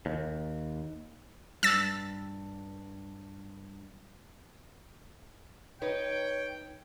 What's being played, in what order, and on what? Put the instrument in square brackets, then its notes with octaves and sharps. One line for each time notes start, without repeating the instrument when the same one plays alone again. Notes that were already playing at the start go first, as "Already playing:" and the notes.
[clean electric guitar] D#2
[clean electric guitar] G2 [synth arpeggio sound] E6 A6
[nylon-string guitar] D#4 B4 [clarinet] C#5 [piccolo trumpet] G5